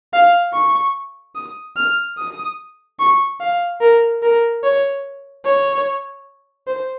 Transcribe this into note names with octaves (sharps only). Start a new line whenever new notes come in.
F5
C#6
D#6
F6
D#6
C#6
F5
A#4
A#4
C#5
C#5
C5